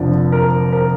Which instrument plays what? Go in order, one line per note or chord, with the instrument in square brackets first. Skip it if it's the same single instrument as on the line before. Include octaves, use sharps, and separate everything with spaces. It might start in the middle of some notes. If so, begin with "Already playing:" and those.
Already playing: [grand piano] F1 F2 D3 F3 D5
A#4
A#4